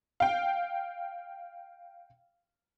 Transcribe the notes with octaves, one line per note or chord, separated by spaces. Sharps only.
F5 G5